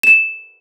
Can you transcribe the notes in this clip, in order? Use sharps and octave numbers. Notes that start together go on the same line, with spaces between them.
E7